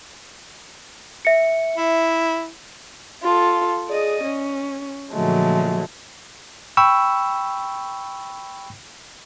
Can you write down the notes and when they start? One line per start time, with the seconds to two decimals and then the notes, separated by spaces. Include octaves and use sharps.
1.25 E5 C#7
1.77 E4
3.22 F4 A4
3.88 G#4 D5 D#5
4.23 C#4
5.12 A#2 D3 F3 F#3 G#3 A3
6.77 G5 B5 C#6 E6